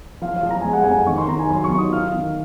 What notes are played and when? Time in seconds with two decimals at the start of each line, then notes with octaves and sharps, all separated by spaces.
0.22 F3 F5
0.36 F5
0.43 F3
0.51 A#5
0.61 G#3 G#5
0.73 F#5
0.84 F2 G#5
1.07 D#3 C#6
1.18 C6
1.28 D#3 A#5
1.39 G#5
1.50 F#3 C6
1.64 C#6
1.71 D#3
1.78 D#6
1.92 F4 F6
2.14 D#3